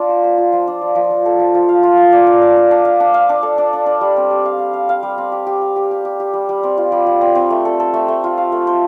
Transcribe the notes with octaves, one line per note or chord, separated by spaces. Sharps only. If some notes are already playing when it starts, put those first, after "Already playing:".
Already playing: D4 F4
C5
C5
F4
F3
D4
F3
F3
F3
A4
F3
F3
F5
F4
F5
D5
D4
F5
D4
D4
F5
D4
F5
D4
A4
D4
D4
D4
G3
C4
G4
F5
F5
F5
F5
G3
C4
G4
G4
F5
G4
G4
G4
G4
G3
G3
C4
F4
G3
G3
C4
C4
A3
A4
A4
A3
A3
F4
F5
A3
C5